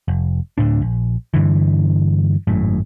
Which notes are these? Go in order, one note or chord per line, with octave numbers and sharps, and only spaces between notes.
F1
D2 A2 D4
A#1
G2 D3 E3
G#1 F#2 A2